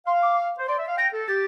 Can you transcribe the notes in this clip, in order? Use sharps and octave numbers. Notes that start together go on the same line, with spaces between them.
F5 C6
D6
C5
D5 C6
E5
F5
G5 A#6
A4
G4 A6